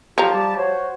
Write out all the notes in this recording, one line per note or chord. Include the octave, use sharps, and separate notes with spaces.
F3 F#3 E4 G4 A#5
G3 G4 A5
F#4 C5 C#5